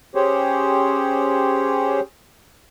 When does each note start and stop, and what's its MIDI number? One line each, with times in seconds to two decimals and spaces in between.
0.15 2.00 61
0.15 2.00 67
0.15 2.00 68
0.15 2.00 72
0.15 2.00 73